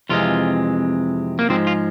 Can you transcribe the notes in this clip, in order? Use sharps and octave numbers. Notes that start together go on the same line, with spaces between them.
F2 C3 E3 G#3 F4
A#3
G#2 F3 G#3 C4
F4